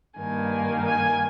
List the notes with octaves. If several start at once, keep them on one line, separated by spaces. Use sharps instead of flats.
G2 D#3 A#3 G#5
G#5